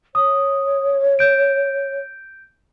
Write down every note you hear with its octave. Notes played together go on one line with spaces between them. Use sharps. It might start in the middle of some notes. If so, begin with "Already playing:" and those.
C#5 D#6
G6 D7